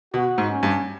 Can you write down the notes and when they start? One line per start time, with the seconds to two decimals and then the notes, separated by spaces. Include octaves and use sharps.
0.14 B2 F#4
0.38 G#2
0.50 C#4
0.63 G2